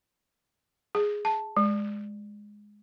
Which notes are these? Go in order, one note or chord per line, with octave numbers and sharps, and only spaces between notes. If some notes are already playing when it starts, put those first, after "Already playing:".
G#4
A5
G#3